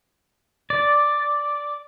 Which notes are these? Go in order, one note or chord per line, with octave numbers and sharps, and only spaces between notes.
D5